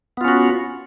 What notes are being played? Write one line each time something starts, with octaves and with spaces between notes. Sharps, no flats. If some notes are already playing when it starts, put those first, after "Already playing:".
B3 C#4 F4 F#4